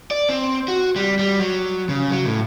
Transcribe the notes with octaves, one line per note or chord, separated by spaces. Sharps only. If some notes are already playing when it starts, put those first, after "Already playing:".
D5
C4
F#4
G3
G3
F#3
C#3
F#3
A2